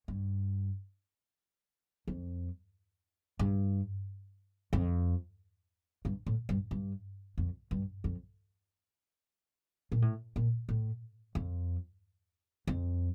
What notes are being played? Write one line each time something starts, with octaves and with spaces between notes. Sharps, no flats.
G2
F2
G2
F2
G2
A2
G2
G2
F2
G2
F2
A#2
A2
A#2
A2
F2
F2